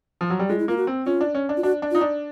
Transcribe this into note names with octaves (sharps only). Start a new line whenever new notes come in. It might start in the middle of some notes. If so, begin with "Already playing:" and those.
F3
F#3
G3
G#3 F4
E4
A#3 F4
F#4
C4
C#4 F4
D4
C#4
D4
F4
D4 F#4
D4
D#4 F4
D4